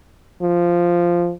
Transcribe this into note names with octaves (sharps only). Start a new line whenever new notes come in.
F3